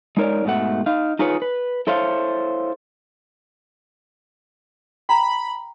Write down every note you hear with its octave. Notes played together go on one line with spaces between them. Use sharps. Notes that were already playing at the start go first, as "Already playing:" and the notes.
G#3 D#4 A#4 C#5 D5
G#2 B2 A3 F#5
D#4 F5
D#4 F4 G#4 B4 C#5
B4
E4 A4 C5 C#5 F5
G5 A#5 B5